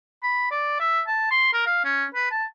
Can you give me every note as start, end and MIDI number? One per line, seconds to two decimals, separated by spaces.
0.23 0.46 83
0.51 0.80 74
0.80 1.01 76
1.07 1.30 81
1.31 1.52 84
1.53 1.64 70
1.66 1.79 77
1.85 2.05 61
2.15 2.29 71
2.31 2.45 81